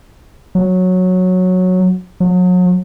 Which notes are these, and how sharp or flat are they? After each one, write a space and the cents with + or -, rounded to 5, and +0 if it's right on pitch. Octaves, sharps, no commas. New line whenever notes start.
F#3 -10
F#3 -35